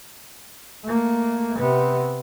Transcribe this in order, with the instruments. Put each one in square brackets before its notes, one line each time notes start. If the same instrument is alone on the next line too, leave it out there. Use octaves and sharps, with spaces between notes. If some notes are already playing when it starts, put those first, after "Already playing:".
[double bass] A3 A#3
C3 B3